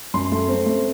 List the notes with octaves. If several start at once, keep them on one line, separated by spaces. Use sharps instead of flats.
F#2 C6
A3
C4
A3